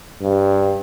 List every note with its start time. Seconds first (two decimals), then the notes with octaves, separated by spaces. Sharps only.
0.21 G2